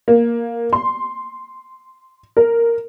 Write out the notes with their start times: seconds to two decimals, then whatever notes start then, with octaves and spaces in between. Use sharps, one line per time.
0.08 A#3
0.73 C6
2.37 A#4